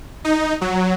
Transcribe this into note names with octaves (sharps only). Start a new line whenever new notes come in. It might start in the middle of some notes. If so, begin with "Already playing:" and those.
D#4
F#3